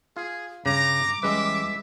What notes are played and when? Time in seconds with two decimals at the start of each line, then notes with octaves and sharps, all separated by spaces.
0.17 F4 G#4
0.66 G2 C#3 A#5 D6
1.23 E2 G3 G#3 C#4 B4 E5